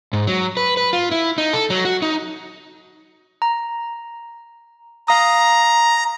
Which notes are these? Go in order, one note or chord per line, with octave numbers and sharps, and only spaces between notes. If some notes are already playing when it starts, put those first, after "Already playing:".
G#2
F#3
B4
B4
F4
E4
D#4
A4
F#3
F#4
D#4
A#5
F5 A#5 D#6